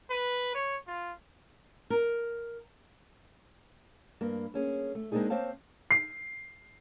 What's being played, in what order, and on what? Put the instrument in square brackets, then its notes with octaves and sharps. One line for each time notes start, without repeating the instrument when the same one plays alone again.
[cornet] B4
C#5
F4
[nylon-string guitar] A#4
[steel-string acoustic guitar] G2 A#3
A#3 C#4 G#4
A3
G#3 A#3 C4 D4 D#4 G#4
A#3 C4 C5 C#5 F5 A5
[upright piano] C7